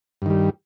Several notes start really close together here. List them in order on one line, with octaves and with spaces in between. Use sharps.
G2 D#3 G3